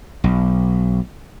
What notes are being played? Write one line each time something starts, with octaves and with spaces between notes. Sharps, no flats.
B1